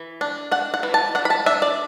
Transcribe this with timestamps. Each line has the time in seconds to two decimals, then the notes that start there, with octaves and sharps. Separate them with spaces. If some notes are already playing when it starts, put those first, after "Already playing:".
Already playing: E3
0.21 D4
0.51 D4 F#5
0.74 F#5
0.83 E3
0.94 A5
1.15 D4 F#5
1.25 B5
1.30 A5
1.46 D4 E5
1.62 D5